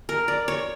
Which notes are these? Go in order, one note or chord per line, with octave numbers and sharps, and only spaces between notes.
A#4
D5
C#5